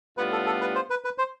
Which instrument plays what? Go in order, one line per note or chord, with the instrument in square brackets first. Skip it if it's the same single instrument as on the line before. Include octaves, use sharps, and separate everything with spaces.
[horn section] A2 G3 B3 D4 F4 [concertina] B4
[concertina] A4
A4
B4
C5
B4
B4
C5